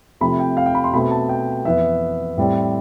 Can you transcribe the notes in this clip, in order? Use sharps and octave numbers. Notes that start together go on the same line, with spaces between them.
C3 F3 A3 C4 B5
G5
F5
G5
B5
C6
B2 A3 C4 B5
A5
G5
F2 E3 B3 E5
A2 G3 C4